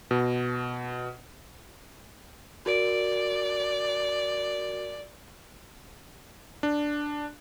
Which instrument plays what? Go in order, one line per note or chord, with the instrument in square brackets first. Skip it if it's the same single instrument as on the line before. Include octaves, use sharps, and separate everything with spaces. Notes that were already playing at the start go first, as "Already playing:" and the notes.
[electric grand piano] B2
[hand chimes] F#4 A#4 D7 [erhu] D5
[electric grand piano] D4